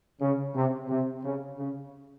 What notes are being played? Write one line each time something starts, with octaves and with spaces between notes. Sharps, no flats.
C#3
C3
C3
C#3
C#3